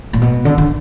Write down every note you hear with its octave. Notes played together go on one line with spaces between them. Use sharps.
A#2
B2
D3
D3